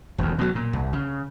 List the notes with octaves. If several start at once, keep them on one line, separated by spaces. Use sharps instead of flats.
E1 D2
B2 F#3
A#2
C2
C#3